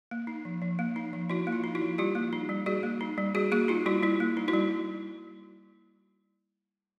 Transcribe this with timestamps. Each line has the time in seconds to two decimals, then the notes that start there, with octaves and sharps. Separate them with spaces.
0.11 A#3
0.27 D#4
0.45 F3
0.62 F3
0.79 A#3
0.96 D#4
1.13 F3
1.30 F3 E4 F#4
1.47 A#3
1.53 F4
1.64 D#4
1.75 E4 F#4
1.82 F3
1.98 G3 F4 G4
2.15 A#3
2.33 D#4
2.49 G3
2.66 G3 F#4 G#4
2.83 A#3
3.01 D#4
3.18 G3
3.35 G3 F#4 G#4
3.52 A#3 F#4 G#4
3.68 D#4 F4
3.86 G3 E4 F#4
4.03 G3 E4
4.20 A#3
4.37 D#4
4.48 E4 F#4
4.54 G3